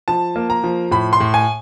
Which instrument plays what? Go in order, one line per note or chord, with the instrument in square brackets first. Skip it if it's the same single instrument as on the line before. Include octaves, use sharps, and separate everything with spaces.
[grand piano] F3 A5
A#3
A#5
F3
A2 B5
C6
A2
G#5